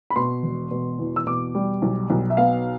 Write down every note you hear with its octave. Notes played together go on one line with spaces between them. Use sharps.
B5
B2 C6
E1
B2
E2
E6
B2 D6
G3
B1
B1
E5
B3 F5